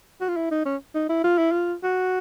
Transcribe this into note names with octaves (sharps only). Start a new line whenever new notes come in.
F#4
F4
E4
D#4
C#4
D#4
E4
F4
E4
F4
F#4